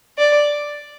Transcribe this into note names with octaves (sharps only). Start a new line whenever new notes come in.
D5